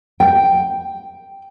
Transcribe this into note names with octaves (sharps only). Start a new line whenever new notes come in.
G5